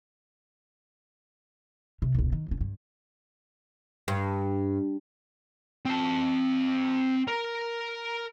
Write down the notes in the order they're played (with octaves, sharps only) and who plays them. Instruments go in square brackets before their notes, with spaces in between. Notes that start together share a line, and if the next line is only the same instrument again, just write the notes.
[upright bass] C3
E1 C#2
D#3
F1 C#4
G2
[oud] G2
[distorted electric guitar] C4 A5
A#4